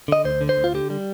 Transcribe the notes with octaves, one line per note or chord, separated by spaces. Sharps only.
D3 D#5
D2 C5
D3
C5
D2
F4
D3 G4
G3